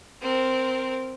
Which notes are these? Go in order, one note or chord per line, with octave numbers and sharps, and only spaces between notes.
C4 A#4